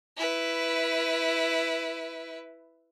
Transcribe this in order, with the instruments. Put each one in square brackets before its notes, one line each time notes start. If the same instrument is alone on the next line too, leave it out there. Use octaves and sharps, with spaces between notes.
[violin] E4 B4